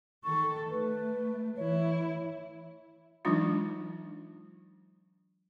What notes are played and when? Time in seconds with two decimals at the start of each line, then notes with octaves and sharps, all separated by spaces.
0.24 D#3 A4 C#6
0.70 A3 B4
1.57 E3 E4 C#5
3.25 E3 F#3 G#3 D4 D#4 F4